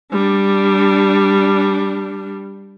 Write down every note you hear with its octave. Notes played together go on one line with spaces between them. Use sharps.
G3 D4